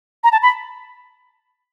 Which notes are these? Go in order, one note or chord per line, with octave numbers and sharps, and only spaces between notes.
A#5
A5
B5